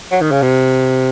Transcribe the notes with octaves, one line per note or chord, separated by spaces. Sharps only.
F#3
D#3
C#3
C3